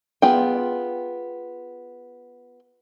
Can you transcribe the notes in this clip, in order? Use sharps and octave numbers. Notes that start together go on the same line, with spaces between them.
B3 F4 G#4 G5